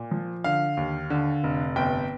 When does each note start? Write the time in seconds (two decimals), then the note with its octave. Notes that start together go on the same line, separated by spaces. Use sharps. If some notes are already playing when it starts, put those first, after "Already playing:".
Already playing: A#2
0.11 F3
0.44 D3 F5
0.77 D#2
1.10 D3
1.44 F1
1.76 G1 G5